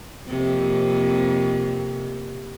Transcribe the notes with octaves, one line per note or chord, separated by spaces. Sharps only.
F2 C3 A#3